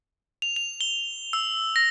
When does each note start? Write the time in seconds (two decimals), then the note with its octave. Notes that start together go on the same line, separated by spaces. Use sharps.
0.42 F7
0.56 F7
0.81 G7
1.33 E6
1.76 A#6